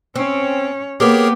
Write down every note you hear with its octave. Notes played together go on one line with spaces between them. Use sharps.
C4 C#4 C#5
A#3 B3 G4 G#4 A#4 C#5